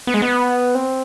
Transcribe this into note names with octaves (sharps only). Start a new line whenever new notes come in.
B3
G#3
B3
C4